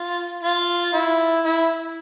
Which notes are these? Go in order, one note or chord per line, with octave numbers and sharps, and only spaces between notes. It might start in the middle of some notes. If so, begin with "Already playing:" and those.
Already playing: F4
F4
E4
E4